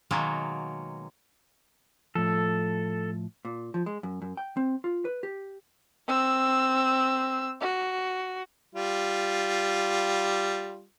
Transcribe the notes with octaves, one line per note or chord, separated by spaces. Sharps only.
B2 D#3 F#3 G#3 A#3
A2 F3 A4
A#2
F3
G#3
F#2
F#2
G5
C4
F4
B4
G4
C4 E6
F#4
G3 F4